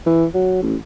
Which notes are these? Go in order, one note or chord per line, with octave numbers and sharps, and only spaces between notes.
E3
F#3
A1